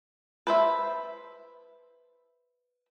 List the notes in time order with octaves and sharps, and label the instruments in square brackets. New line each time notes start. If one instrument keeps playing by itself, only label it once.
[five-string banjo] B4 C5 E5